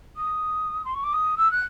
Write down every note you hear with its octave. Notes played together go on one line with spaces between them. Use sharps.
D#6
C6
C#6
D6
D#6
E6
F#6